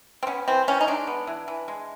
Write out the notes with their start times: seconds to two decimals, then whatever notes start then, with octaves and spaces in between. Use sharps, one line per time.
0.23 C4
0.27 B3 C#4
0.48 E3 C4
0.68 E3 C#4
0.81 D#4
0.87 G#3 D4
1.07 B3
1.27 E3
1.48 E3
1.68 G#3